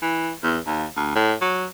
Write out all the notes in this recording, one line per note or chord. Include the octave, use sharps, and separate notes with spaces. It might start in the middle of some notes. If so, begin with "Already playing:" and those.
E3
E2
D#2
D2
A2
F#3